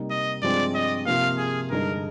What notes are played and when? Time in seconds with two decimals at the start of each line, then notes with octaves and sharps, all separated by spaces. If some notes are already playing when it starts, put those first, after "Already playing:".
Already playing: C3 G3 A#3 D#4
0.10 D#5
0.42 G2 F3 G#3 C4 D5
0.75 D#5
1.06 C3 F3 A#3 F5
1.38 G#4
1.70 G2 D3 G#3 D#4 A#4